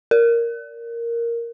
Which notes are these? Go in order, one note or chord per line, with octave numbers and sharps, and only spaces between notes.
A#4